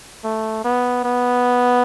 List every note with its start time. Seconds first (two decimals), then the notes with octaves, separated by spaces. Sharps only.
0.24 A3
0.64 B3
1.04 B3